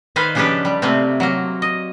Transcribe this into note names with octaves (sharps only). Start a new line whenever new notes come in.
D#3 B4 C5 F5
C#3 F3 D4 G4 A4 B4
G3
C3 A3 A#3 C4
F#3 A#3
D#5